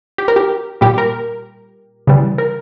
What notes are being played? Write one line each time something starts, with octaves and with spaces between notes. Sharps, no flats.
G4
A#4
G4
A#2 G3 G4
A#4
C#3 E3 G3
A#4